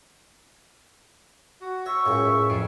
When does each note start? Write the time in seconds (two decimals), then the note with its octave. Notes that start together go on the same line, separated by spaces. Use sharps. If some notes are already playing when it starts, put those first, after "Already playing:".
1.61 F#4
1.86 C#5 E5 C#6
2.06 C#2 F#2 A2 C#3
2.49 F2 F4 D7